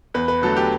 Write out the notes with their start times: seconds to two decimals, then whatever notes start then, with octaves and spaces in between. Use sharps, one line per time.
0.14 E2 B4
0.28 B4
0.42 D3 F#3 A3 A4
0.56 G4